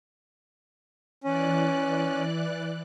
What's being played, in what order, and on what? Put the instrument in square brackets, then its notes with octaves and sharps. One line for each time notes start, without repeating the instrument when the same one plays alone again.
[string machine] E3 D5 F#6 [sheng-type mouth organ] C#4